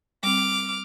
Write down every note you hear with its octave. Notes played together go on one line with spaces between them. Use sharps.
G3 C4 D6 F6